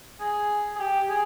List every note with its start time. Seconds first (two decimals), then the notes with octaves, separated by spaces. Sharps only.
0.20 G#4
0.76 G#4
0.80 G4
1.09 G#4